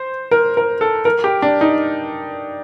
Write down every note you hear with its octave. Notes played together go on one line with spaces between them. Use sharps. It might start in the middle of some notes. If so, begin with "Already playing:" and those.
Already playing: C5
A#4
A#4
A4
A#4
G4
D4
D#4